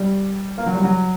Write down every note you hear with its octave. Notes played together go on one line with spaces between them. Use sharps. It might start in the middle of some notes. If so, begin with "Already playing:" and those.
Already playing: G3
A#3
F#3
G3
F#3